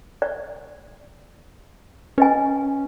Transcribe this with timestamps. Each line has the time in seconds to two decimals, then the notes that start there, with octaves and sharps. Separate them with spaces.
0.22 D5
2.18 C#4 B4 D#5 G#5